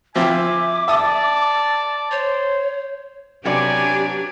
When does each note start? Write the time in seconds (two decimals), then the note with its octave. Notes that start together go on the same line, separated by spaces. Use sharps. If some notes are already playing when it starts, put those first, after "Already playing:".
0.16 F3 C4 F4 E5 G#5 D6
0.88 D5 E5 A5 D#6
2.12 C5 C#5
3.45 C3 F#3 B3 D4 G4 D5 G#5 D6